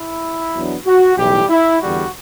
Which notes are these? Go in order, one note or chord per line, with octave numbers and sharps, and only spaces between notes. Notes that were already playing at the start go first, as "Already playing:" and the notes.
Already playing: E4
E2 B2 F#3 B3 D4
F#4
B1 A2 E3 G3 G4
E4
E2 D3 G3 F#4